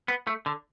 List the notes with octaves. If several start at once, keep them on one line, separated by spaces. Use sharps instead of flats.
B3
A3
D3